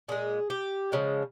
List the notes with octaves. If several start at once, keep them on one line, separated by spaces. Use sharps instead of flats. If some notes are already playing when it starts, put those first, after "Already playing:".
A#2 G#3 G#4
G4
C#3 F3 G#3